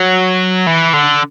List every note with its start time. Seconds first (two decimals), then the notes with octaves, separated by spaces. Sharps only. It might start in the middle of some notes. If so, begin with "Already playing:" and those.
Already playing: F#3
0.67 E3
0.93 D3